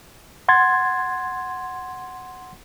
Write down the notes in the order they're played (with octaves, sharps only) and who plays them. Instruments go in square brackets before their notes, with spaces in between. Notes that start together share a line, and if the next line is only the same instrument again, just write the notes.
[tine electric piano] F#5 C6 G#6 A6